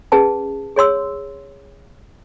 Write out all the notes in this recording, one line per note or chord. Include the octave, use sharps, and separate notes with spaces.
C#4 G#4 B4 A5
G#4 C#5 C6 E6